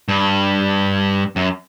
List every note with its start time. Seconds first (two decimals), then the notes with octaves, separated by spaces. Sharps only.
0.09 G2
1.36 F#2